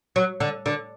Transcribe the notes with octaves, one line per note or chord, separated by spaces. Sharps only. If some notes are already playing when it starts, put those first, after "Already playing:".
F#3
D3
D3